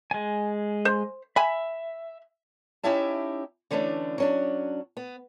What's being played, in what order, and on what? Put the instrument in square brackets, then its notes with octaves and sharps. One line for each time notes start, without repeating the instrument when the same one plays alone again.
[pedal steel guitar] G#3 G#5
[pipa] C5
[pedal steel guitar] E5 [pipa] G#5 B5
[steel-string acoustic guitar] C#4 D#4 E4 G4 E5 A5
D3 E3 A3 C#4 D4
F#3 C#4 D4
B3